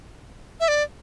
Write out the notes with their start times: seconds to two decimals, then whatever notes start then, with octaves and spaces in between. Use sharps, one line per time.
0.60 E5
0.68 D5